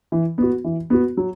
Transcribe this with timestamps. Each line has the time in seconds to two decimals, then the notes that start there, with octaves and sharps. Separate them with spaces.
0.12 E3
0.38 B3 F#4
0.64 E3
0.90 B3 F#4
1.17 F#3